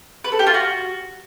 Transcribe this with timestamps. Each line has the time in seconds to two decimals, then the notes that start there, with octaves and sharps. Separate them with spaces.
0.24 B4
0.32 A4
0.39 G4
0.47 F4
0.54 F#4